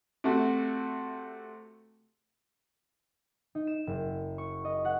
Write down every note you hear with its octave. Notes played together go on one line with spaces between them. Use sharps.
C3 A3 F#4
D#4
E7
F#1
C#6
D#5
F#5